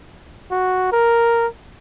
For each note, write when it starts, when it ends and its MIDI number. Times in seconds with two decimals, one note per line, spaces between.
0.51 0.90 66
0.92 1.47 70